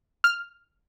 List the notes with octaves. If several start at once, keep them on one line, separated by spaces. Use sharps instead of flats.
F6